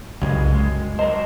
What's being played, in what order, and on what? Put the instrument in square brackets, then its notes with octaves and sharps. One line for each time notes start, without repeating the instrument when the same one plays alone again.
[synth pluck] C2 [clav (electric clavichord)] F#2 [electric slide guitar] C#3 G#3
[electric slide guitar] G#3
[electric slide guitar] F#2 A#4 C5 [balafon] D#5 [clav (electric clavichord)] A5